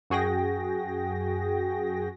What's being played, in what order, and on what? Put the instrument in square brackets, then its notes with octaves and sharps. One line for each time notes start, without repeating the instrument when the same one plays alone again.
[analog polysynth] F#2 F#4 G#4 G5 A#6